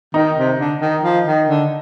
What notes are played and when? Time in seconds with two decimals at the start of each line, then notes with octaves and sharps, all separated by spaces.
0.14 D#3 D#4
0.37 C3
0.59 D3
0.81 D#3
1.03 F3
1.27 D#3
1.49 D3